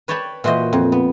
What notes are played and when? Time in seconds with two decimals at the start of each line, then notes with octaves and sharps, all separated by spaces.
0.08 B4 C#5 D5 G5 A5 B5
0.44 A#2 E3 F#4 C5 D#5
0.73 F2
0.92 B3